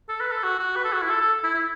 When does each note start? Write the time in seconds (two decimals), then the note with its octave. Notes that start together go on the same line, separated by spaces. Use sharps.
0.09 A4
0.20 B4
0.31 A4
0.43 F#4
0.59 F#4
0.76 B4
0.84 A4
0.93 F#4
1.01 E4
1.10 A4
1.21 A4
1.43 E4
1.54 E4